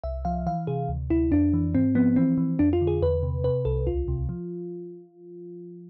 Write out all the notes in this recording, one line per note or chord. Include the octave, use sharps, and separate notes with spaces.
C2 E5
F3 F5
E3 F5
C3 G#4
D2
D2 E4
F2 D4
E3
G#2 C4
F3 B3
E3 C4
E3
F2 D4
F4
D3
G#4
E2 B4
C3
C3 B4
C2 A4
D2 F4
C3
F3